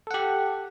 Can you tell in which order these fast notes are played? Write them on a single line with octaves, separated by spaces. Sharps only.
A4 F#5 G4